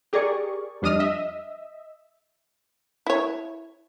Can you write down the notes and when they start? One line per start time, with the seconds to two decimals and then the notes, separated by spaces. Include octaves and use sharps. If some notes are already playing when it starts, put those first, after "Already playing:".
0.13 G4 G#4 A#4 D5 C#6
0.82 F2 G3 D4 D#5 D#6 F6
1.00 D#5 E5
3.07 E4 C#5